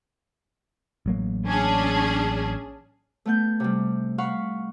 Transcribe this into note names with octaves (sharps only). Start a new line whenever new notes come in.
A1 F#3 A#3
C#4 D4 G#4
A3 B3 G6
C3 G3
F5 F#5 B5 C#6